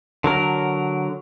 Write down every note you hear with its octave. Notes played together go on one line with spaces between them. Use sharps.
D3 F#3 A#4